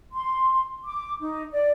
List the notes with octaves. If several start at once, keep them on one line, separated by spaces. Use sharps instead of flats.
C6
D6
D#4
D5